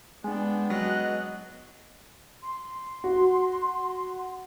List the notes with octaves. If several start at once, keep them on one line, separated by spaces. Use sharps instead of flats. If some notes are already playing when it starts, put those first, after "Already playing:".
G#3 B3 D4 G5
F#3 D#5 F#6
C6
F#4